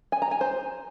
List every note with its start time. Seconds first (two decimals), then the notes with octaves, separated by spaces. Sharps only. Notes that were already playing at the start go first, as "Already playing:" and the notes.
0.12 G#5
0.22 A#5
0.31 G#5
0.41 C5